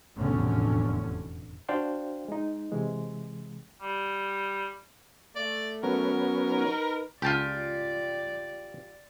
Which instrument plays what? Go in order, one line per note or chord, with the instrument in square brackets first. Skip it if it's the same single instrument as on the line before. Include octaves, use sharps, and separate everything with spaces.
[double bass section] F1 B1 E2 A2 D3 C#4
[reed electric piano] D4 F#4 C5 D5 F5 G5
G#3 D#4
C3 E3 G#3
[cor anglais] G3
[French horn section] A3 [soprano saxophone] D5
[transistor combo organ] F#3 B3 C#4 [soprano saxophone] A#4
[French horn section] D#4 B4
[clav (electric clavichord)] C#2 A5 [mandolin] F4 G4 [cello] D5